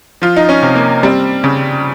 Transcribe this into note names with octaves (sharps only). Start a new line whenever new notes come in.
F3 F4
D#4
C#4
C3
A#3
G3 C4
C#3